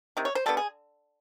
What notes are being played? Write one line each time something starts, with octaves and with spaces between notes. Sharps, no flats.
C3 D#3
C#5
C5
D3 G3 B3 A4
G#4